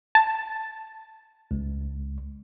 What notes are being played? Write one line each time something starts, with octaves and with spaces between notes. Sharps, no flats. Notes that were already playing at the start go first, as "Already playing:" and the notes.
A5
C#2